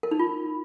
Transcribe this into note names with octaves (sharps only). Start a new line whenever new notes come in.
A#4
D#4
F4